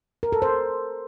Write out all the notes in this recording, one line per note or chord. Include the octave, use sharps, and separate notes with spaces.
A#4
A4
C5